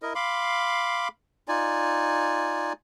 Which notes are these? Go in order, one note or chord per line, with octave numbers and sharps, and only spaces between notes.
E4 A#4 D#5
F5 B5 C6 D6
D#4 F4 D5 G#5